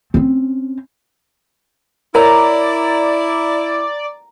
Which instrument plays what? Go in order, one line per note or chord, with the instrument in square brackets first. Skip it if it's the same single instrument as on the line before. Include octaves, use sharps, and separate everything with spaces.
[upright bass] C4 C#4
[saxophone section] E4 [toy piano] A#4 C#5 [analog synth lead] D5 [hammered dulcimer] A#5